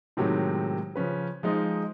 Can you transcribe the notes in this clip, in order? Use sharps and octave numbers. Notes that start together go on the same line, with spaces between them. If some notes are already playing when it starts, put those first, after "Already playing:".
A2 C3 D#3 F#3 G#3 G4
C#3 F3 C#4 B4
F3 G#3 D#4 F4